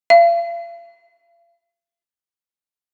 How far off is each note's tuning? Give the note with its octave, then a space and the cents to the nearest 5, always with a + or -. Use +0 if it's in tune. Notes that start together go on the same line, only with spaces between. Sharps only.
F5 -40